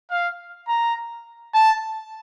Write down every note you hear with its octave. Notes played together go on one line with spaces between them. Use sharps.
F5
A#5
A5